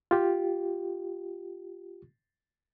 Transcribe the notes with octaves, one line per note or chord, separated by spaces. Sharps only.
F4 G4